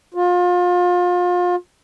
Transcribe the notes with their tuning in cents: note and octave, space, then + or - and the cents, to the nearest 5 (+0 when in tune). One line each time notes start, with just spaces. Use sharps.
F4 +30